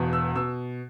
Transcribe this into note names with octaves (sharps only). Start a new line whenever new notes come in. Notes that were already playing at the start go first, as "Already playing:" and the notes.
Already playing: E1 E2 B2
E6
B2 E6